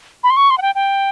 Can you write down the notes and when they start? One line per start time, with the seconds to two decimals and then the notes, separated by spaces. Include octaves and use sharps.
0.23 B5
0.30 C6
0.37 C#6
0.50 C6
0.58 F#5
0.62 G5
0.75 G5